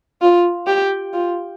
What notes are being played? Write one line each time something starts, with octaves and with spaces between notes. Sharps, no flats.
F4
G4
F4